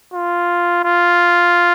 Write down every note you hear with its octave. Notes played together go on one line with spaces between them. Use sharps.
F4
F4